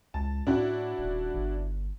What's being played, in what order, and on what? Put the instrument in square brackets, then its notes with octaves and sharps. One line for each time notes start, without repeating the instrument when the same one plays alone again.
[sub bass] C#2 [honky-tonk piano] A5
[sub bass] A2 [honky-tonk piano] D4 E4 F#4
[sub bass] D#1
G1